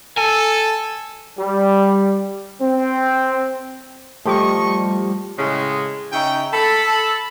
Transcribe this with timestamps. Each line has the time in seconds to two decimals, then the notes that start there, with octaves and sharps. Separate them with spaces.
0.17 A4 G#5
1.38 G3
2.62 C4
4.25 F3 G3 A3 G4 D#5 C#6
5.38 A2 C#3 G#3
6.13 C#3 D#4 C#5 E5 G5
6.53 A4 B5